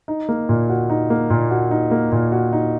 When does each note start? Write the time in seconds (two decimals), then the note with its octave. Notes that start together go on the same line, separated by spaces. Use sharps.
0.08 D#4
0.29 A#3
0.49 A#2
0.70 F#4
0.90 D#4
1.10 A#3
1.30 A#2
1.51 F#4
1.71 D#4
1.91 A#3
2.12 A#2
2.32 F#4
2.53 D#4